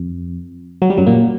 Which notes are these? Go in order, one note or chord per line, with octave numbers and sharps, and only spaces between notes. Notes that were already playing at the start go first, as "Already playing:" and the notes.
Already playing: F2
F#3
G3
F#2 F#3
A#2 A#3